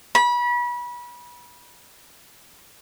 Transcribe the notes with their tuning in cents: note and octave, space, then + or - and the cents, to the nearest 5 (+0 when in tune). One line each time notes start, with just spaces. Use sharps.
B5 -30